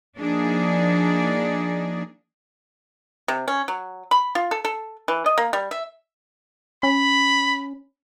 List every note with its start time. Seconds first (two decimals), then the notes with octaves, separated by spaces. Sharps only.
0.18 F3 A#3 D4 D#4 G#4 D5
3.28 C3
3.48 C#4
3.68 F#3
4.11 B5
4.35 F4
4.51 A4
4.64 A4
5.08 E3
5.26 D#5
5.38 A#3
5.53 G3
5.71 E5
6.83 C#4 B5